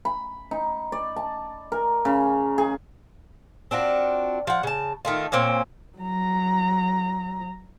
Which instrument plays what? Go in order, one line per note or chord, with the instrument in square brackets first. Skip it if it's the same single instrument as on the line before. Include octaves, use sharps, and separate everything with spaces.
[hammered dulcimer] B5
D#4
D5
A5
A#4
C#3
G#4
[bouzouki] C4 D4 F4 F#4
F3 F#5
C#3 A5
D#3 A3 F4
A#2 A#3 C4 C#4
[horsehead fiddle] F#3 A#5